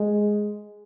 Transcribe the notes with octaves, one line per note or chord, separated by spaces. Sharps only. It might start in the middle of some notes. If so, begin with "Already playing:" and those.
Already playing: G#3